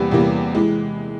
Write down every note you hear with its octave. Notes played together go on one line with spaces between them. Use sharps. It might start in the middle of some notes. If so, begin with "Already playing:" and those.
Already playing: E2 C3 G3 A#3 B4
E2 C3 E3 G3 A#3
E3 G#3